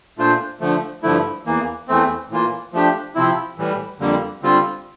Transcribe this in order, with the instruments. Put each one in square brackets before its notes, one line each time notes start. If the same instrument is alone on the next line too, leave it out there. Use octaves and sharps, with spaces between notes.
[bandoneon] A#2 A3 D4 F4 C5
D3 F3 A3
G2 D3 F3 A3 E4
E2 E3 A#3
E2 E3 A3 C4
A2 E3 A#3 F4
F3 A3 D4 G4
C3 F3 C4 E4
A2 E3 G3
F2 D3 G3 A#3
D3 G3 C4 F4